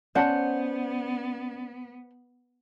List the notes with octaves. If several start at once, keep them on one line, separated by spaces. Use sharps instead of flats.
B3 C#4 C5 D5 F#5 A5